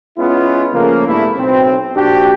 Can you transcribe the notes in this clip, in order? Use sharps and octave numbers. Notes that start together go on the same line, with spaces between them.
G#3 B3 C#4 E4 F4
C#3 F3 A3 A#3
G2 A3 B3 E4
B1 C4
A#1 D4 F#4 G4